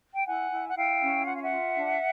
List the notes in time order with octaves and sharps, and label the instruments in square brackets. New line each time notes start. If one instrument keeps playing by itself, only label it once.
[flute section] G5
E4 F#5 G#5
E4
F#5
E4 F5 G5
C#4
F4 F#5
F5
E5 F#5
F4
D4